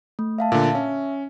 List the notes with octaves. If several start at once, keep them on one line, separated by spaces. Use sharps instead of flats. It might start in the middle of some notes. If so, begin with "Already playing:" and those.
A3
E5 F5 A5
A#2 D3
C#4 E5